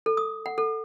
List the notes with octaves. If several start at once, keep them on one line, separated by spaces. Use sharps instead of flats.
A4
D#6
F#5
A4